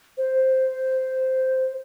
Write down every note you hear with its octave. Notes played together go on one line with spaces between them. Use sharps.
C5